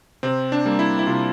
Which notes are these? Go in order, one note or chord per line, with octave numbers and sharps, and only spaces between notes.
C3 C4
D4
G3 A#3
E4
E4
C3 F4